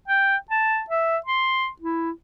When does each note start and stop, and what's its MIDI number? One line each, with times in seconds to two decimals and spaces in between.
0.08 0.36 79
0.51 0.83 81
0.90 1.17 76
1.26 1.68 84
1.82 2.11 64